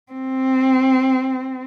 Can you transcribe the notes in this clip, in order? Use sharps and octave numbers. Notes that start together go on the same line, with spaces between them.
C4